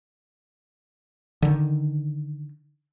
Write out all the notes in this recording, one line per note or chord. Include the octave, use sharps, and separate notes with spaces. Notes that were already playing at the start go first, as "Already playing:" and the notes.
D3 D#3